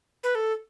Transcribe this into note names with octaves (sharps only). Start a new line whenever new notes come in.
B4
A4